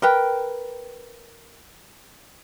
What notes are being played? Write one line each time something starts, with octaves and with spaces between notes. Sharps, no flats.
A#4 B4 G5